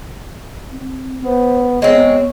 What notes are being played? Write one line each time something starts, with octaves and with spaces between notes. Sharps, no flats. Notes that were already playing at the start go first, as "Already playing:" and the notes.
C4
B3 C5
G#3 B3 C4 C#5